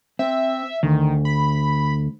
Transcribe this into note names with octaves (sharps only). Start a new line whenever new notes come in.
C4 E5
D2 D#3
B5